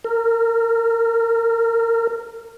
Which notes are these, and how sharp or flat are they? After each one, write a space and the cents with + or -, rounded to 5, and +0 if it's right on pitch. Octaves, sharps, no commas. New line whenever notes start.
A#4 -25